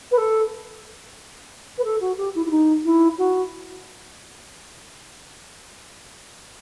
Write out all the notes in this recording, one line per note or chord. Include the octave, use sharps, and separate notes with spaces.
B4
A4
B4
A4
F#4
G4
E4
E4
D#4
E4
F#4